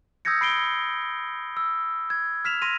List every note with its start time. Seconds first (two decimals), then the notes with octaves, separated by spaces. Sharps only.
0.25 D#6 E6 G6 G#6 A#6 C#7
0.41 B5 C7 D7 G7
1.57 E6
2.10 G#6
2.45 F6 B6 E7 F7
2.62 C6 A#6 D#7 F7